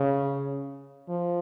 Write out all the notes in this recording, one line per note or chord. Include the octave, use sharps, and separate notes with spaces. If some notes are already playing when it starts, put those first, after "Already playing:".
Already playing: C#3
F3